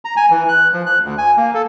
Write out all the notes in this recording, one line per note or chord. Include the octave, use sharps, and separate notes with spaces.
A#5
G#5
E3
F#6
F3
F#6
D2
G#5
A#3
A4